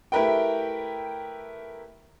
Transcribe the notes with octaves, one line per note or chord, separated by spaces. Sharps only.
A3 E4 G4 A#4 B4 G5